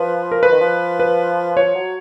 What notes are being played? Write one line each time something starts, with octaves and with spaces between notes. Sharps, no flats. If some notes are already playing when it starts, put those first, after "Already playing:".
Already playing: F3 B4
A#4
F3 B4
D#3
F3
B4
F3 C#5
F#3